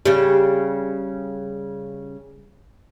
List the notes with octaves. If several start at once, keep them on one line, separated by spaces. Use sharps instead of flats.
C#3 G3